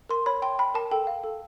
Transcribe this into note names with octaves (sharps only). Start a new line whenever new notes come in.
A#4 C6
C#5 B5
G5 C6
G5 B5
A#4 A5
A4 G5
F5
A4